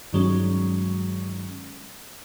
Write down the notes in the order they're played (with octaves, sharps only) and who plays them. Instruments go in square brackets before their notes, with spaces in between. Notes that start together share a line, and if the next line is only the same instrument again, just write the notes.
[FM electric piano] G2 D#3 F#3 G#3 C#4